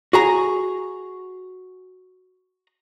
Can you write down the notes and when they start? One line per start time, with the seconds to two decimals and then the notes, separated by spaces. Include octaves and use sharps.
0.13 F#4 G#4 A#5